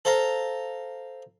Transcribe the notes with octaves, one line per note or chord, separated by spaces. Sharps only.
A4 C5 F5 A#5